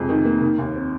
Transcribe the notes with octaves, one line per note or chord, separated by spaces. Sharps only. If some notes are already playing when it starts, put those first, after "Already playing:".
Already playing: F2 C3 G#3
D#3
A#3
D#3
D#2
C4